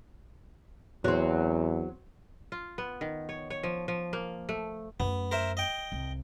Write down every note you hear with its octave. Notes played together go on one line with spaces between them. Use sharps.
E2 F#3 C4
F4
B3
D#3
C#5
C#5
F3
F3
A#3
A3
F#2 A3 B3
A#4 C5 E5
D#5 G5
C2